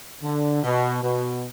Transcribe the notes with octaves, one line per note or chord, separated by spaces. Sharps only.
D3
B2
B2